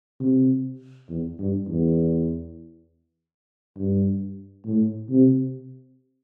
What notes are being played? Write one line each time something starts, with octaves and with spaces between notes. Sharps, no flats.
C3
E2
G2
E2
G2
A2
C3